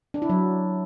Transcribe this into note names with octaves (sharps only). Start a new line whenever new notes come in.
D4
E4
F#3